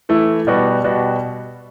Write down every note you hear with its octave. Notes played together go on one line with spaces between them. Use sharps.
E3 A3 E4
B2 G3 B3 F#4
B2 G3 B3 F#4